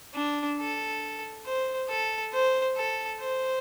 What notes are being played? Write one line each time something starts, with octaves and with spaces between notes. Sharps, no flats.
D4
A4
C5
A4
C5
A4
C5